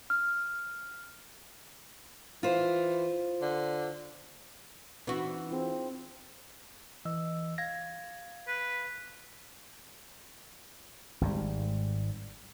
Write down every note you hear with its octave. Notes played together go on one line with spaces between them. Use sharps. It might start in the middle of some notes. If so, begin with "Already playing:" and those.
F6
E3 F4 C5
D3
E3 C4 D4 D#4 F#4
C4 F4 G#4
E3 D#5 E6
F5 G#6 A#6
B4
G#1 G#2 B2 G3